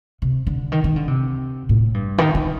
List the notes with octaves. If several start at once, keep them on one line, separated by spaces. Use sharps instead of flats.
C3
D3
D#3
D#3
D3
C3
A2
G2
D#3
D#3